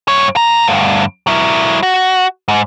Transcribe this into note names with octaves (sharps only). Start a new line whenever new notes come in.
G2 C#5
A#2 A#5
D2 G2
F#3 E4
F#4
G#2